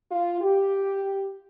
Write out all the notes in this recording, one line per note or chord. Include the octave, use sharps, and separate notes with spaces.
F4
G4